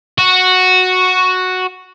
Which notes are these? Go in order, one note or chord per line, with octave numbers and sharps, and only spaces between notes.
F#4